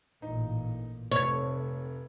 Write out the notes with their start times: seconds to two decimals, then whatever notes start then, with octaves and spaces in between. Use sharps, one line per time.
0.22 A1 A#2 D#4
1.12 F1 C3 A3 C#5 G#6